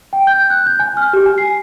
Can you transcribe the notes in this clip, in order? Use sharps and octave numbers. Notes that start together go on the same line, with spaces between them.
G5
G6
F#6
G6
G#5
F6
G4
G#5
C7